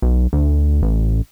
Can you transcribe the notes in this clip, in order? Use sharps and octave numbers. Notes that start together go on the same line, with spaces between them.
B1
D2
A1